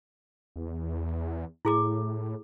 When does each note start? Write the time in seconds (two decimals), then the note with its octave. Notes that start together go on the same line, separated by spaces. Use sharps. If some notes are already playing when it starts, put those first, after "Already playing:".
0.56 E2
1.65 A2 E4 G#4 D6